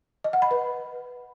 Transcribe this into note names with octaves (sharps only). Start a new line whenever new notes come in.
D#5
F#5
B5
B4